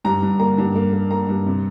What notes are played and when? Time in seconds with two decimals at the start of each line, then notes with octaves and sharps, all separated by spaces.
0.05 G2 A#5
0.22 G2
0.39 A#3 A#5
0.58 G2
0.75 A#3
0.93 A#3
1.11 A#3 A#5
1.29 G2
1.46 C3